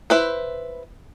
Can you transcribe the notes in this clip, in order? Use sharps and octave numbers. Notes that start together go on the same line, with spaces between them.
E4 B4 C5